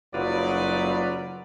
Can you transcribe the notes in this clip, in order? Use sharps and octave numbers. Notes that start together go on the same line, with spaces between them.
F#1 F#3 G3 D#4 F4 B4 D5